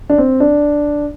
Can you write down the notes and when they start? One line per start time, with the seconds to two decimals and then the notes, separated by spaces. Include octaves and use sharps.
0.09 D4
0.18 C4
0.40 D4